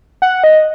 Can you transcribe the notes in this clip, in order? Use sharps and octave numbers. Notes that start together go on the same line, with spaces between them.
F#5
D#5